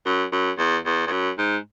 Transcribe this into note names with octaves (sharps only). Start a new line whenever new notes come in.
F#2
F#2
E2
E2
E2
F#2
G#2